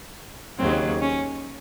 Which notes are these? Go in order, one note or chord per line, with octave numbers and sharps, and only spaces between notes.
D#2 C#3 F#3 C4
C#4